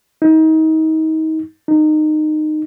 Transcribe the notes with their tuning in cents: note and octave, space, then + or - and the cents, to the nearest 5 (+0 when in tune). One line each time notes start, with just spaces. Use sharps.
D#4 +30
D#4 -20